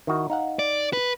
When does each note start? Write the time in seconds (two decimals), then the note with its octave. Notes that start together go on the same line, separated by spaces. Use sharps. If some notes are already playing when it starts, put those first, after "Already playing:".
0.07 D#3 E4 F#4
0.30 D#4 F5 F#5
0.59 D5
0.93 B4